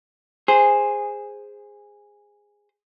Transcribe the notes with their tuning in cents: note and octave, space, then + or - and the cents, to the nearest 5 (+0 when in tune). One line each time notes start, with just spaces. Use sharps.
G#4 -10 C5 +0